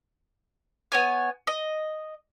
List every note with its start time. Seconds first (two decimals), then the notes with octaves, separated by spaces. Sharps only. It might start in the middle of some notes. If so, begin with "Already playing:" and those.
0.92 B3 C#5 G#5
1.47 D#5